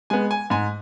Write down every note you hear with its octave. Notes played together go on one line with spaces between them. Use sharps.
G#3 B3 G#5
G#5
G#2 G#5